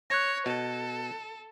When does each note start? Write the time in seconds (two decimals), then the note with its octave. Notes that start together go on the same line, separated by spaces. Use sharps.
0.10 C#5 F#6 G#6 A#6
0.46 B2 A4